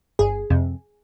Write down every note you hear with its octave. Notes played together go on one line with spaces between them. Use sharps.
G1 G#4
F2 C3